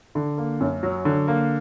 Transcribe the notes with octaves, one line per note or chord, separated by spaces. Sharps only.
D3
A#3
F#2
F#3
D3
A#3